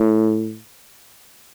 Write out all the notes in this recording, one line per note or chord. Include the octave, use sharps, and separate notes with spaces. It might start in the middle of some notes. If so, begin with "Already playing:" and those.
Already playing: A2